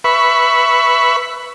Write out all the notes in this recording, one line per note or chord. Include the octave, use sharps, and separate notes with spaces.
B4 E5 B5 C#6